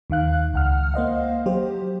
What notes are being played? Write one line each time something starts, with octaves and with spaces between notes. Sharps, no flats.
D#2 D#3 F5 F#6
C#2 F#5 F6
A#3 C5 D#5 F5
F#3 G4 C5